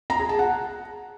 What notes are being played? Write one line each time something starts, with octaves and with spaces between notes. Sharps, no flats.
A#5
G#4
A5
F#5